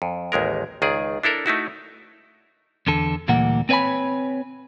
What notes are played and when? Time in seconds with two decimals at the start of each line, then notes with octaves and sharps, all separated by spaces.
0.02 F2
0.32 A1 D#2 G#3 A#4
0.82 C#2 D#3 G#4 D5
1.23 D4 E4 A4 A#4
1.46 A3 D#4 E4 F#4
2.87 E2 D3 A4
3.28 D2 A#2 E3 G3 A#3 F#5
3.69 C4 B4 C#5 F#5 G#5 B5